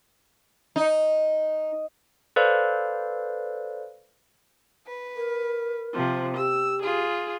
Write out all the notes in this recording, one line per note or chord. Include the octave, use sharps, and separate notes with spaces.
D#4
A4 B4 C5 D5 F5
B4
A#4
C3 F3
G4 E6
F4 G#4